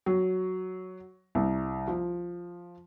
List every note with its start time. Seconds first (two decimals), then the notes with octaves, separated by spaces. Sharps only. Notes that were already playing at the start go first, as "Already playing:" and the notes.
0.06 F#3
1.35 C2
1.88 F3